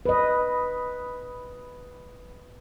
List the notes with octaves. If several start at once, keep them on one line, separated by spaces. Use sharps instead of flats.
B4 D#5